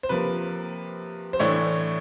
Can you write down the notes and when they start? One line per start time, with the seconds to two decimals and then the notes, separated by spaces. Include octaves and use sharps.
0.03 C5
0.09 C3 F3 A#3 B4
1.33 C5
1.39 A2 E3 A3 D4 C#5